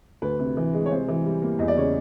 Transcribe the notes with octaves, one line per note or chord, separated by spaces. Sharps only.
D2 B4
C3
E3
G#3
C#5
C3 C5
E3
G3
A#3
E2 D#5
D5
C#3 C#5